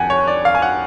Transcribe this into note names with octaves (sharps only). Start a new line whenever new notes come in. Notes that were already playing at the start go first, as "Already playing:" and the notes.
Already playing: F2 F#5 G#5
C#5
D5
F5
G#5
F#5